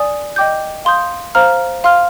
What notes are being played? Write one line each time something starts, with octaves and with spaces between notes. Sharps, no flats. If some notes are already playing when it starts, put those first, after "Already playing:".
Already playing: D5 G#5 D#6
D#5 G5 D6 G6
F5 C6 D#6 G6
C5 F5 A#5 F6
F5 C6 F6